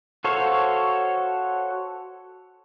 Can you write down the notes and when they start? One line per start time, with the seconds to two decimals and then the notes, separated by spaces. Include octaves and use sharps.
0.24 F#4 A4 C5 C#5 F5